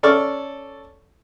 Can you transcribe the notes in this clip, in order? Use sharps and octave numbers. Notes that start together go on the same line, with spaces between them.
C#4 A4 D5 C#6 F6